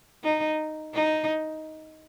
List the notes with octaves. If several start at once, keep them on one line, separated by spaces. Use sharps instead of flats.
D#4
D#4